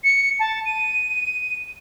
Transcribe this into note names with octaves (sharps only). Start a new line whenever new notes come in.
C#7
A5
D#7